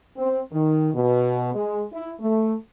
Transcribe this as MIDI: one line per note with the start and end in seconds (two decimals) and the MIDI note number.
0.17 0.40 60
0.52 0.89 51
0.94 1.50 47
1.55 1.83 56
1.92 2.12 64
2.21 2.55 57